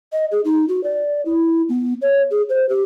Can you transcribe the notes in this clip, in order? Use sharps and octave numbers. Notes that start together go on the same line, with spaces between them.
D#5
G#4
D#4
F#4
D5
E4
B3
C#5
G#4
C5
G4